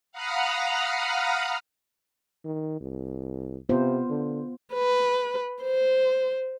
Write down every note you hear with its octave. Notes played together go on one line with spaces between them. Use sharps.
F5 F#5 A#5 B5 D#6 F6
D#3
C2
C3 B3 F4 C5
D3
B4
C5